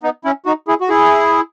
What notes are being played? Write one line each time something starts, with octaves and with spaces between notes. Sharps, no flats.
B3 D#4
C#4 E4
D#4 F#4
E4 G#4
F#4
E4 G#4